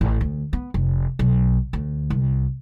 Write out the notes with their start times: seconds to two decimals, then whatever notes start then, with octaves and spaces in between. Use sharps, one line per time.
0.01 A1
0.21 D2
0.53 B3
0.74 F1
1.19 B1
1.73 D2
2.10 C2